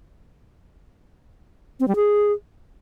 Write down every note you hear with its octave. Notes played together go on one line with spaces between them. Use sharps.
C4
G3
G#4